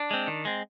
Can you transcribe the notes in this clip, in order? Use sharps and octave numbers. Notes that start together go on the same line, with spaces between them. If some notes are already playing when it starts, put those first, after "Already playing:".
Already playing: D4
G#3 C4
D#3
G#3 C4